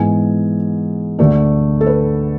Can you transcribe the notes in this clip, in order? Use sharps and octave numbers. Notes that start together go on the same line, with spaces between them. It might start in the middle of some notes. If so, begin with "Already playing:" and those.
Already playing: G#2 E3 G#3 B3 G#5
D2 D3 A3 D4
A4
B4